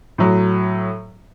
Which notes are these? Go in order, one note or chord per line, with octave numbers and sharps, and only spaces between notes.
A2 F#3